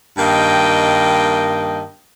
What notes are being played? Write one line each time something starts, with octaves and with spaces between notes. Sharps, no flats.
G2 D#3 A#3 D#5 G5